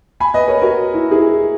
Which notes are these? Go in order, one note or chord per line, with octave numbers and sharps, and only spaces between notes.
G#5 B5
B4 D#5
A#4 C#5
F#4 A#4
E4
E4 G#4